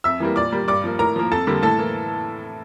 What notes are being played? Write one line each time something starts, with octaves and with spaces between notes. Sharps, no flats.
F2 E5 E6
E3 G3 A#3
A#2 D5 D6
G3 A#3
G2 D5 D6
F3 A#3
A2 A#4 A#5
F3 A#3
F2 A4 A5
D3 G3 A#3
A2 A4 A5
E3 A#3